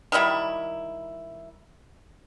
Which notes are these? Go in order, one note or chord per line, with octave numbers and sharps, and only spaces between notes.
D#3 F#3 G3 E4